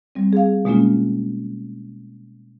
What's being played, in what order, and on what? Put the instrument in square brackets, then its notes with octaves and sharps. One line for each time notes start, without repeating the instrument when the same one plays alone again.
[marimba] G3 C4
G#4 F5
B2 G#3 A#3 C#4 F4